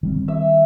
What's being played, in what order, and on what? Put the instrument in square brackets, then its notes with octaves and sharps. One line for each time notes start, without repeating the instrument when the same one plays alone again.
[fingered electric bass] D#3 G3 C4
[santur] E5